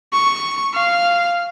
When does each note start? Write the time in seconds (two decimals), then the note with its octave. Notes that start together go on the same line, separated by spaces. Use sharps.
0.13 C#6
0.74 F5